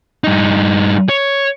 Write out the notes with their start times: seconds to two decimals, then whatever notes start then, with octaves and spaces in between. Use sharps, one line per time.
0.24 G2 D#4
1.09 C#5